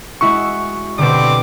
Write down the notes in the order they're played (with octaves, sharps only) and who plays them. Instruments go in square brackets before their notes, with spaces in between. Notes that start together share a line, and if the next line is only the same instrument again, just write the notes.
[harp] G#3 E4 F#4 [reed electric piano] C#6
[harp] B2 D3 [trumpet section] G3 C4 D6